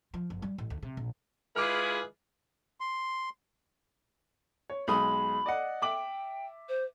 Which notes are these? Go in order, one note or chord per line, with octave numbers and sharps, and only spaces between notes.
F3
F#1
G3
A1
D2
C3
A#1
G#3 E4 F4 G#4 B4 D6 F6
C6
C#5
B1 G#3 B5 D#6
D5 D#5 F#5
E5 G5 D6 F#7
C5